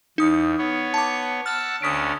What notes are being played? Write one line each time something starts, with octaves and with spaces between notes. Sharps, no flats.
E2 D#4 D#6
B3 C#5
A5 D6
F#5 A5 E6 F6
D2 D3 C#4 D#6 B6 D7